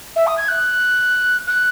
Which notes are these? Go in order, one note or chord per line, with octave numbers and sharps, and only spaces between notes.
E5
D#6
G#6
F#6
F#6